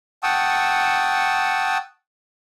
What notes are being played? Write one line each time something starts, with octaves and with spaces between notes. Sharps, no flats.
F#5 G5 A5 C#6 D#6 E6